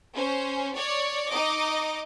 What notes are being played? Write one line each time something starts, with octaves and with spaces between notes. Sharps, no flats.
C#4 C5
C#5 D5
D#4 D#5 D6